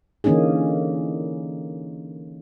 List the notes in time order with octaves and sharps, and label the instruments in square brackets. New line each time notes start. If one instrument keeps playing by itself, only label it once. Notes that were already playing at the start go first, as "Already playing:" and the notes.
[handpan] D3 E3 A#3 C#4 D#4 G#4